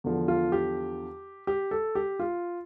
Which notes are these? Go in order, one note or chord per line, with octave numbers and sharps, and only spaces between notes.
E2 D3 F3
F4
G4
G4
A4
G4
F4